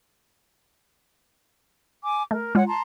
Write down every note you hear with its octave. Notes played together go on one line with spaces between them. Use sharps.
G#5 D6
A3 A#4
G#3 F4 C#5 F#5
A5 A#5 C6